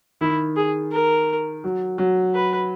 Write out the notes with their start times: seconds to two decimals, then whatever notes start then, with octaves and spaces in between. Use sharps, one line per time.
0.21 D#3 E4
0.56 G#4
0.92 A#4
1.64 F#3
1.98 F#3
2.34 B4